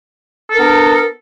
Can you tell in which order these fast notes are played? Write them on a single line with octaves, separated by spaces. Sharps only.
A4 A#4 D4 B3